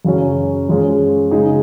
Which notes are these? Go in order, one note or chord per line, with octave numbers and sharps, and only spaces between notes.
F#2 C#3 F#3 C#4
F#2 F3 G#3 C#4 G#4
C#3 G#3 D#4 G#4